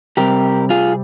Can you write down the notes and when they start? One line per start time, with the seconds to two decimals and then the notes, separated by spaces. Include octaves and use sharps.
0.17 C3 G3 C4 G4 A#4
0.70 F4 G#4